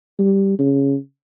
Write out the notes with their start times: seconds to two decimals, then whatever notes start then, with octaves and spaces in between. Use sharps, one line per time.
0.19 G3
0.59 C#3